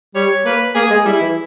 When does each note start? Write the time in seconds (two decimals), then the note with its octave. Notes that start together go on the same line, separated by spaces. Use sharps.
0.15 G3 C#5
0.45 A#3 B4
0.75 A#3 G#4
0.90 G#3
1.05 G3 E4
1.21 E3